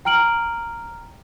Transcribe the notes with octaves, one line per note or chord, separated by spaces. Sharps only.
G5 A#5 F6 D7 F#7